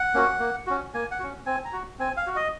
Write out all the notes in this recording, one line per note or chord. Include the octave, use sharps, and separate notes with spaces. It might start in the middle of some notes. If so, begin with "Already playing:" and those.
Already playing: F#5
A#3 C#4 F#4
A#3
C#4 F#4
A#3 G#5
F#5
C#4 F#4
C4 G#5
A#5
F#4
C4 G#5
F5
F#4
D#5